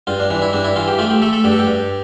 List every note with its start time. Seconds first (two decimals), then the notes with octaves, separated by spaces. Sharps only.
0.07 G2 F4
0.20 D4
0.30 E3 D4
0.42 E4
0.53 G2 D4
0.65 E4
0.76 E3 F4
0.88 G4
0.99 A3 F4
1.10 G4
1.22 A3 A4
1.33 A4
1.44 G2 G4
1.52 A4
1.59 G4
1.67 G2